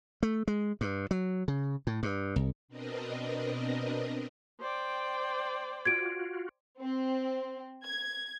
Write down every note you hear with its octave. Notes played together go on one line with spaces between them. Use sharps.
A3
G#3
G2
F#3
C#3
A2
G2
C2
B2 C4 D4 A#4 B4 D#5
C5 D5 G5
F4 F#4 G#6 D7
C4
G#6